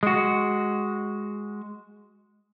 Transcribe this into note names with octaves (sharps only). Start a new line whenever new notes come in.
G#3 F#4